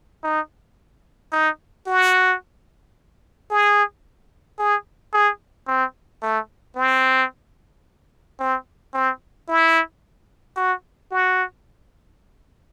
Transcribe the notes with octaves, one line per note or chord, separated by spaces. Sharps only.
D#4
D#4
F#4
G#4
G#4
G#4
C4
A3
C4
C4
C4
E4
F#4
F#4